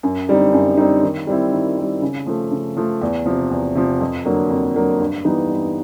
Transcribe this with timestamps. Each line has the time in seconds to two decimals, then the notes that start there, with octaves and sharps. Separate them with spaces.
0.03 F#2
0.28 D3 G3 C4 D#4
0.53 F#2
0.77 D3 G3 C4 D#4
1.03 D#3
1.27 G3 C4 E4
1.52 D#3
1.77 G3 C4 E4
2.02 C#3
2.26 F3 A3
2.51 C#3
2.77 F3 A3
3.01 E2
3.26 C3 F3
3.51 E2
3.75 C3 F3
4.01 F2
4.25 D3 F#3 A#3
4.50 F2
4.75 D3 F#3 A#3
5.00 G2
5.25 E3 G3 B3 D#4
5.50 G2